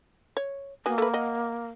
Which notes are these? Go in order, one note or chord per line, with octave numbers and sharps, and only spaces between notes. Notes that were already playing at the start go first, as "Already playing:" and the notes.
C#5
A#3 B3 F#4 G#5
A3 B4
D#5 F#5